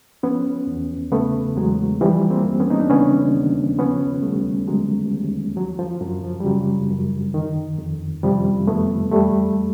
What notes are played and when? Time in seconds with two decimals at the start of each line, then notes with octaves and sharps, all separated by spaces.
0.23 F3 B3 C#4
0.67 E2
1.12 C#3 A3 B3
1.56 E2 F#3 G#3
2.01 E3 F3 G3
2.30 A#3 C4
2.45 D#2
2.60 B3 C#4
2.70 D#4
2.80 D4
2.89 C#3 B3 C#4
3.34 D#2
3.78 F3 B3 C#4
4.23 D#2 G3 A3
4.67 D3 F#3 G#3
5.11 D#2
5.56 F3 F#3
5.79 F3
6.01 F#2 F#3
6.24 F3
6.40 G3
6.45 C#3 F#3
6.90 F#2
7.34 D#3
7.78 F2
8.23 C3 F3 G3
8.67 F2 A3 B3
9.11 E2 G3 A3